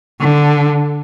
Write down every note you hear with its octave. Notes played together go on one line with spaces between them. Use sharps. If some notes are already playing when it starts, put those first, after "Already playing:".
D3